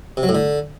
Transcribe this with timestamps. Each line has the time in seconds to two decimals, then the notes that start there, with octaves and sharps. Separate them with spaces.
0.17 C3
0.23 F#3
0.29 A2
0.35 D3